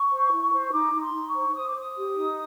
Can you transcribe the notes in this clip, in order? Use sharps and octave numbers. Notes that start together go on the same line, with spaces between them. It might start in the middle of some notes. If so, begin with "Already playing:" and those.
Already playing: C#6
C5
E4
C5
C#6
D#4 D6
D#4
C6
D#4
C#6
C5
C5 D#6
D6
C5 D#6
G4
D#4